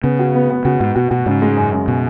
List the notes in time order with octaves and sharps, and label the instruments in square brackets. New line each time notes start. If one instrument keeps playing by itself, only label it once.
[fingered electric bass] C#3 [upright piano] B3
[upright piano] F#4
B3
B3
[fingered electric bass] C#3 [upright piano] F#4
[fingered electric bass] G#2 [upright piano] F#4
[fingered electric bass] B2 [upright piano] F#4
[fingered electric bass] B2 [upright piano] F#4
[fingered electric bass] G#2 [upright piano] C#3
[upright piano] G#3
F#2
F#2
[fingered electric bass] B2